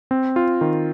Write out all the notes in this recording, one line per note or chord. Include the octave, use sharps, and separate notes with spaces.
C4
F4
D#3